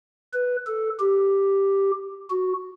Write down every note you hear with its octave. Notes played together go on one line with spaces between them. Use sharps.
B4
A4
G4
F#4